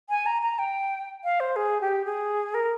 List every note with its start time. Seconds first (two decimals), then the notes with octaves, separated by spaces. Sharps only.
0.10 G#5
0.26 A#5
0.42 A#5
0.59 G5
1.24 F5
1.40 C5
1.56 G#4
1.81 G4
2.05 G#4
2.54 A#4